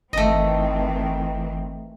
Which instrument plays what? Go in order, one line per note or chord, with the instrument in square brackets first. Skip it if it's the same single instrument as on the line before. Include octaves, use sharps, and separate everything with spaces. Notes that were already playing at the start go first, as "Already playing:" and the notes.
[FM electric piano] G1 [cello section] D#3 E3 C4 [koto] A3 D#5